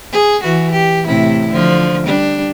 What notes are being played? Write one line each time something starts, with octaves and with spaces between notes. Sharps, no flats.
G#4
E3 F#4
G4
A2 C3 E4
D3 F3
G3 D4